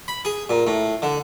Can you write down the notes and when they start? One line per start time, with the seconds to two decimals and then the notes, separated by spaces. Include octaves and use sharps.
0.08 B5
0.25 G#4
0.50 A#2
0.67 A2
1.02 D3